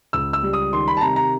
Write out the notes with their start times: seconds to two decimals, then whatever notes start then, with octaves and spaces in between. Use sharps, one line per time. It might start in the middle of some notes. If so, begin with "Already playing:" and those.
0.13 C#2 E6
0.33 E6
0.43 G3
0.53 D#6
0.72 D#3 C6
0.88 B5
0.97 A5
1.01 C3 A#5
1.16 A#5